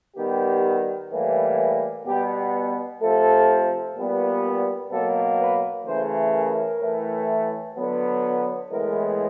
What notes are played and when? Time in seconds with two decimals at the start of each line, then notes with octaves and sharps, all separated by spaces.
0.17 D#3 G3 B3 G4
1.12 A2 E3 G3 A#3
2.07 B2 G3 B3 G4
3.02 C3 F3 A3 A4
3.96 A#2 G3 B3
4.91 B2 F#3 A#3 A4
5.40 B4
5.86 C#3 E3 A3 C5
6.34 A#4
6.81 A2 E3 A3
7.76 D3 F#3 B3
8.71 A2 E3 G#3 B3 A#4